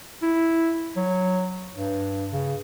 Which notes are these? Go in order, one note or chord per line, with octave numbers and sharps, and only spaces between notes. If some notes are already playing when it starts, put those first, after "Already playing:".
E4
F#3
G2
C#3